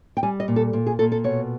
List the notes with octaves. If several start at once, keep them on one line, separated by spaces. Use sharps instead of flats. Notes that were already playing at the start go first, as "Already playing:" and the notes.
G5
G3 G#5
D#5
A#2
A4
A#2
G#4
A#2 A4
A4
B2 C#5